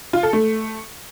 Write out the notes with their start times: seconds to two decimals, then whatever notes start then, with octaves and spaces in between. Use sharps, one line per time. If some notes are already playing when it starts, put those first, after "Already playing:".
0.13 F4
0.23 A4
0.33 A3